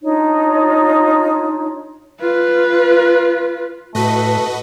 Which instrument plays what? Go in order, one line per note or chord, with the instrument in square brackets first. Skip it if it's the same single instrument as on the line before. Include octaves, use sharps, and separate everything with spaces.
[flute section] D4 D#4 F4 C#5
[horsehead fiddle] F4 B4
[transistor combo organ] A2 [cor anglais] A3 [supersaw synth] F#4 B4 D#5